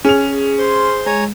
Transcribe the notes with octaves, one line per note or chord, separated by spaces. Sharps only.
C#4 G#4 F7
C5 C6
G#3 C#5 G#5 A#5